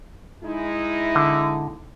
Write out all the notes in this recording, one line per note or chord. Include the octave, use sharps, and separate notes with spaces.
G#3 D#4 E4
D3